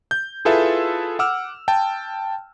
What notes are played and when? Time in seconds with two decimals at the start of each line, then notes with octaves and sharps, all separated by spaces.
0.11 G6
0.45 E4 F4 G#4 A4 B4 E5
1.19 F#5 D6 E6 F6
1.68 G5 A5